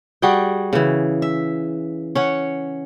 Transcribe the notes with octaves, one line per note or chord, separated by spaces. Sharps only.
G3 F#4 G#4 G5
C#3 E3
E5
C#4 C#5 F#5